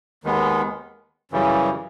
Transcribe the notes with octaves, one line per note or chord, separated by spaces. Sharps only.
D#2 D#3 G#3 B3
F#2 C#3 E3 G3